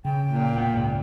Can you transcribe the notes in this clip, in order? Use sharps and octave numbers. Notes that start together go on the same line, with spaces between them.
C#3 G5
A#2
E1 B3
C#2 G#2